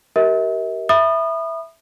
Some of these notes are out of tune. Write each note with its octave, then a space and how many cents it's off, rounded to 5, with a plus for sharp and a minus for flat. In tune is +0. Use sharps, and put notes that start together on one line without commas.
G4 -35 A#4 +5 E5 -45
E5 -5 B5 -10 D#6 -30